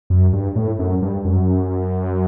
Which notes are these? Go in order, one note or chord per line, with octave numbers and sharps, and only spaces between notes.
F#2
G2
A2
F#2
G2
F#2